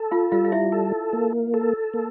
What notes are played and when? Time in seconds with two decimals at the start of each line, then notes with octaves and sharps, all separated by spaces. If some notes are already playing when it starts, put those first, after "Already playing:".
Already playing: A4
0.11 F4 F5
0.32 G3 F4 F5
0.45 F5
0.52 E4 E5
0.72 A4
1.13 A#3
1.54 A4
1.94 A#3